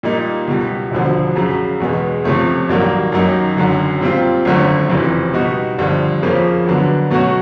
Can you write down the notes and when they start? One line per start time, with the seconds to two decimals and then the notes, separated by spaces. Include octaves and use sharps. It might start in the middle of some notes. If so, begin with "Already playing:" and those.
0.03 A#2 G3 A#3 D#4
0.48 C#2 B2 G3
0.91 E1 D2 D3 F3
1.36 F#2 C#3 F#3
1.80 E2 B2 G#3 B3
2.24 C#2 C3 F3 A3 C#4
2.69 A1 G2 D#3 F#3 A#3
3.12 F#2 D#3 F#3 A#3 D#4
3.57 F#1 F#2 D3 F#3
4.01 A#2 G3 C4 F4
4.45 G#1 F#2 D3 F#3 A3
4.90 F#1 F2 C3 E3
5.33 B2 G3 B3 D#4 F#4
5.78 G#1 G2 D3 F3
6.22 F2 C#3 F3 A#3 C#4
6.66 D2 D3 F#3 B3 D4
7.10 B2 F#3 A3 C#4 F#4